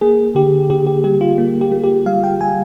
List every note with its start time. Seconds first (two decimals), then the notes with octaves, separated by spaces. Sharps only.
0.01 A#3 G#4
0.35 D3 G4
0.70 D3 G4
0.86 G4
1.04 G3 G4
1.21 F4
1.38 A#3
1.61 G4
1.72 A#3
1.84 G4
2.06 G3 F5
2.24 G5
2.41 G3 G#5